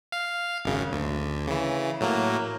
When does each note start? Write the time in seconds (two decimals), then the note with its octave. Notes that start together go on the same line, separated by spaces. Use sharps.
0.12 F5
0.65 G#1 F#2 C#3
0.92 D2
1.48 C#3 E3
2.01 A2 F#3 A#3